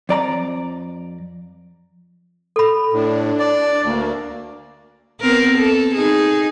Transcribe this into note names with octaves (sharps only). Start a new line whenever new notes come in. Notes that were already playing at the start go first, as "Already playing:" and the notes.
F2 D5 A#5
A4 B5
A2 D4
D5
D2 A#3
B3 C4 A#4
A4
D#4 G#4